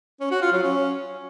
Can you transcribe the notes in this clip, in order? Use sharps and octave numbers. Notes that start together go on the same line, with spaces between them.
C#4
F#4
F4
F#3
C#4